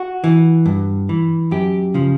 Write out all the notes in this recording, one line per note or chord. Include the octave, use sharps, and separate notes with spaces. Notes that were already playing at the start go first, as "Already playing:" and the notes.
Already playing: F#4
E3
G2
E3
F#2 G4
C#3 F3